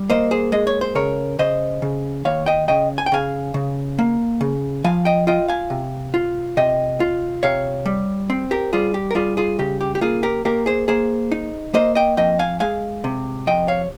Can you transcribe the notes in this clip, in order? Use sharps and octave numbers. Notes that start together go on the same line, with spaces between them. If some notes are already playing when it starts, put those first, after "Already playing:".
Already playing: G3
A#3 C5 D#5
G#4 C5
G#3 D#5
C#5
C5
C#3 A#4 C#5
C#3 C5 D#5
C#3
D#2 C#5 F5
D#5 G5
C#3 D#5 G5
G#5
G5
C#3 F5 G#5
C#3
A#3
C#3
F3 F5 G#5
D#5 G5
F4 D#5 G5
F5 G#5
C3
F4
C3 D#5 G5
F4
C3 C#5 F5
G3
C4
G4 A#4
G3 F4 G#4
G4
A#4
G3 F4 G#4
F4 G#4
C#3 G4
G4
G4
A#3 F4 G#4
G4 A#4
A#3 G4 A#4
G#4 C5
A#3 G#4 C5
D#4
A#3 C5 D#5
D#5 G5
F2 D#5 G5
F5 G#5
G#3 F5 G#5
C3
F2 D#5 G5
C#5 F5